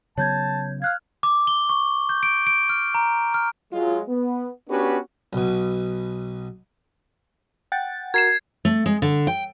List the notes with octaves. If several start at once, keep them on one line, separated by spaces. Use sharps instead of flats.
C#3 F#3 B3 C#5 A5 G6 G#6
F5 F6 F#6 G#6
D6
G7
C#6
G6
D7
D7
F6
A#5
F6
F#3 G#3 F4
B3
B3 C#4 D4 F#4 G4 B4
B1 B2
F#5 G5 A6
F#4 A#4 G#6 C7 E7
A3
G#3
D3
G5